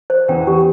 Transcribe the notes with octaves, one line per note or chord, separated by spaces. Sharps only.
C5
E2 E3 G5
G4